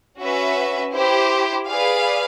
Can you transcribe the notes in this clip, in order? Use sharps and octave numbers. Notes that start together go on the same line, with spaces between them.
C#4 F#4 B4 E5
E4 G4 C5
G#4 B4 D5 F5